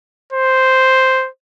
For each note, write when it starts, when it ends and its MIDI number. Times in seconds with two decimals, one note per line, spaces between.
0.33 1.29 72